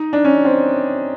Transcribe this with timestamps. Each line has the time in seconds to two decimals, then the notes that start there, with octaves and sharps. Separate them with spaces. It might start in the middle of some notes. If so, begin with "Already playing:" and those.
Already playing: D#4
0.13 D4
0.24 C#4
0.45 C4